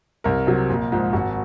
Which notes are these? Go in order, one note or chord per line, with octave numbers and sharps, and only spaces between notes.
C2 A#4
C3 F#3
A#1
G#2 F3
G#1 F#4